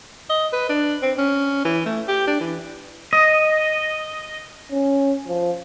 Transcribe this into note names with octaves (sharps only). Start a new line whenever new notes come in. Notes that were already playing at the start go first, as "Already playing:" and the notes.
D#5
B4
D4
C4
C#4
E3
A3
G4
D4
E3
D#5
C#4
F3